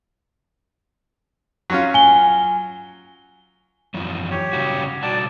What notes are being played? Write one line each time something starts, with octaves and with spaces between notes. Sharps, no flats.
F#3 C#4 F4
G#5 G7
F#2 E3 F3
G4 C#5
C#3 G3 F#4
B2 G3 F#4 D5 A5